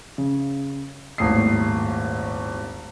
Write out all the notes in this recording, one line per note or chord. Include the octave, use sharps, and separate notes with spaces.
C#3
D#1 G#1 D#2 A2 D#6 C7